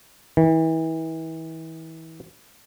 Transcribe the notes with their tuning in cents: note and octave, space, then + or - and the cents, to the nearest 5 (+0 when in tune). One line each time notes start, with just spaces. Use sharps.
E3 -35